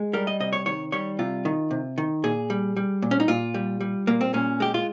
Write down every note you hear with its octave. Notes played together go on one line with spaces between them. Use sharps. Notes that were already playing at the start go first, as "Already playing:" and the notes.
Already playing: G#3
G3 A#4
D#5
C3 D#5
C#5
D#3 C#5
G3 C#5
C3 F4
D#3
C3
D#3
A#2 G#4
G3
G3
A#2
C#4
D#4
A#2 F4
G3
G3
A#2 A#3
C4
A#2 C#4
G#3 G4
F4